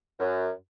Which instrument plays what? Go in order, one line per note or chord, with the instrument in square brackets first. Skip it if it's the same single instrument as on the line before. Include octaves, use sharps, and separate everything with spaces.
[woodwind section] F#2